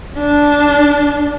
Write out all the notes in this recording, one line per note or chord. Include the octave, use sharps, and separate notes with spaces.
D4